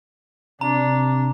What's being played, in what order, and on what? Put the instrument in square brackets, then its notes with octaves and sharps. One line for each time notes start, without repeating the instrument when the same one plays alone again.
[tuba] C3 [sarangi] D4 [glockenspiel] A#5